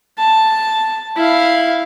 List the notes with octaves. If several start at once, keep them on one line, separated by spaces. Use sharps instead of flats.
A5
E4 F5